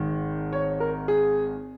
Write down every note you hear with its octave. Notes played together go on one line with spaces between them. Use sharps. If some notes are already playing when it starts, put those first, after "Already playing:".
Already playing: G#1 G#2 D#3
C#5
A#4
G#4